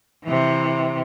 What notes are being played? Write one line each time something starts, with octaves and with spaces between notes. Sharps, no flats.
C3 E3